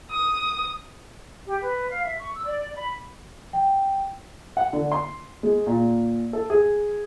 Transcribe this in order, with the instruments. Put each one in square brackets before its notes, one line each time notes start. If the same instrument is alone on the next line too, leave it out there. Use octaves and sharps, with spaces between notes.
[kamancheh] D#6
[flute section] G4
B4
F5
E5
C#6
E6
D5
B5
[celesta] G5
[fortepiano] F#5
D3
C6
G#3
A#2
A4
G#4